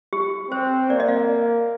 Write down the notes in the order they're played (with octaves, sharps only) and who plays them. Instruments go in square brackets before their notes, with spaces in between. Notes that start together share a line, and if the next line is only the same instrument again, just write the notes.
[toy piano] G4
[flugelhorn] C4 [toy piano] C5
[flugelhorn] A#3 [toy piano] D5
[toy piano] D#5
F5